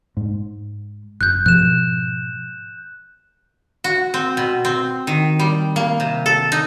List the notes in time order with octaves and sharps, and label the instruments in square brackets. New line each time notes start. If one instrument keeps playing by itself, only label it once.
[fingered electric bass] G#2
[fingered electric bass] F#1 [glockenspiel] F#6 G6
[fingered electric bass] G#2 B2 F3 [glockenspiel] F#6 E7
[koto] F#4
C4
B2
C4
D#3
G3
A#3
C3
A4
D#4